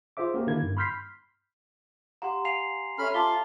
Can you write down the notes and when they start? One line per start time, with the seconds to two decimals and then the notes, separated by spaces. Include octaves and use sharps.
0.17 F4 G#4 C5 E5 D6
0.34 A#3 C#4 F#4 G4 A#4
0.47 D3 D#3 A#3 E4 G#6
0.62 G2
0.77 B5 C6 F6 G6 B6 C7
2.22 G4 F5 F#5 A#5 C6
2.45 F5 G#5 C7 F7
2.98 C#4 A4 C#5 E5 B5 F6
3.14 F4 F5 A5 D6 B6 G7